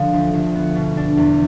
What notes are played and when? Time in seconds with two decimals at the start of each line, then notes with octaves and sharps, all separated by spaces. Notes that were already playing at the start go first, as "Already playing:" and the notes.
Already playing: D3 F3
0.13 D2
0.33 D2
0.55 B3
0.75 B2
0.97 D4
1.17 E2